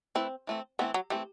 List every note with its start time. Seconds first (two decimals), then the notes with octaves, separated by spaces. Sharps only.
0.15 A3 C4 E4 B4
0.47 E3 A3 C4
0.79 E3 A3 B3 C4
0.94 F#3
1.10 E3 G3 A3 C4